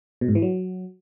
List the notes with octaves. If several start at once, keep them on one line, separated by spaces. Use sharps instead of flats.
B2
G#2
E3
F#3